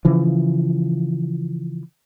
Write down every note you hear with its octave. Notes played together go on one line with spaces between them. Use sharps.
C#3 E3 F3